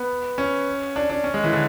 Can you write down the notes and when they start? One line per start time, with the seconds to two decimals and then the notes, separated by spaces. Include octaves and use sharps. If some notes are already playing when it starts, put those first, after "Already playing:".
Already playing: B3
0.38 C#4
0.96 D4
1.10 D4
1.24 C#4
1.34 G#3
1.44 E3
1.53 D3